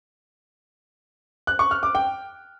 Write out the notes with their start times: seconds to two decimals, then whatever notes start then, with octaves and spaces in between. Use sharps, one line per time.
1.47 F#6
1.59 C#6
1.71 F6
1.83 D6
1.95 G5